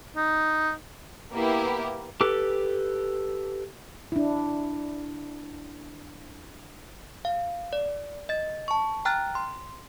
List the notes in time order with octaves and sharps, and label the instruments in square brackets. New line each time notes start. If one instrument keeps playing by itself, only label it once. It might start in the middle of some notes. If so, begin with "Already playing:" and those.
[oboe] D#4
[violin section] A#3 B3 E4 G4
[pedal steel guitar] G4 A4 B4 D6
[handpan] D4 E4
[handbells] F5
D5
D#5 A6
A5 C#6
G5 A#5 F6 F#6 A6
C6